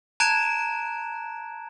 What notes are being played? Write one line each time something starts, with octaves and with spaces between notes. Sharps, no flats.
A5 A#5 F#6 G#6 D7 E7